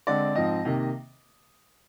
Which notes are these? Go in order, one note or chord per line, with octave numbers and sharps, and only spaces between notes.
D3 G#3 C4 D5
G#2 F3 C4 D#5
C3 D#3 A#3